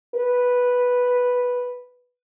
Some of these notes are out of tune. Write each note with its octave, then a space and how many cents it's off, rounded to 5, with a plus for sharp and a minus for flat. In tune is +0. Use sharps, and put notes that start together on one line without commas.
B4 -5